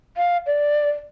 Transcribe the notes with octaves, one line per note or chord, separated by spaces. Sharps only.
F5
D5